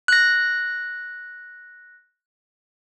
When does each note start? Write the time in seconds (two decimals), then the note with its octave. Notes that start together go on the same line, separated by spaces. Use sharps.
0.08 F#6 A#6